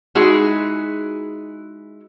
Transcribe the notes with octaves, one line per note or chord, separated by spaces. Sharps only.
G#3 D#4 E4 F#4 G#4